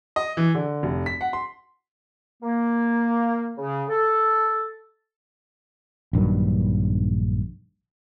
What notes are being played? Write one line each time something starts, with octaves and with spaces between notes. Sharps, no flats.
D#5
E3
D3
F1
B6
F#5
C6
A#3
C#3
A4
A#1 G2 D#3 F#3